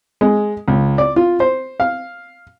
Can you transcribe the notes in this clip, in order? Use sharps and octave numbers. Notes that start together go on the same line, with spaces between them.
G#3
C#2
D5
F4
C5
F5